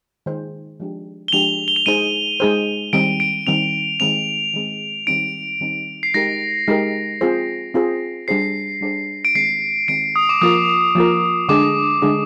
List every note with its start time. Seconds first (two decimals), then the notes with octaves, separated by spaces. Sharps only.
0.26 D#3 G#3 D#4 G#4 C5
0.80 F3 G#3 D4 G4
1.28 G7
1.33 F3 G#3 D4 G4 F7
1.68 G7
1.76 F7
1.86 G#3 D#4 G#4 C5 D#7
2.40 G#3 D#4 G#4 C5
2.93 D#3 G3 C4 D7
3.20 D7
3.47 D#3 G3 C4 F7
4.00 D#3 G#3 C4 F7
4.53 D#3 G#3 C4
5.07 D#3 G3 C4 D#4 D7
5.61 D#3 G3 C4 D#4
6.03 C7
6.14 G#3 D#4 G4 A#4 A#6
6.68 G#3 D#4 G4 A#4
7.21 C4 F4 G#4 C5
7.74 C4 F4 G#4 C5
8.28 G3 D4 G#4 C5 C7
8.81 G3 D4 G#4 C5
9.25 D7
9.35 D#3 G#3 C4 C7
9.88 D#3 G#3 C4 D7
10.16 D#6
10.29 D6
10.42 F3 A#3 F4 A#4 D#6
10.95 F3 A#3 F4 A#4
11.49 D3 G#3 D4 G#4 D6
12.02 D3 G#3 D4 G#4